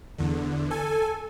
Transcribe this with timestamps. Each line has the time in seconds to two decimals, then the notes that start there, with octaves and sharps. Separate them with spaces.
0.18 E2 D3
0.71 A4 G#5